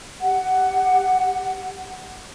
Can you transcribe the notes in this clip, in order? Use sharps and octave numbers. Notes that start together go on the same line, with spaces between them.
G4 F#5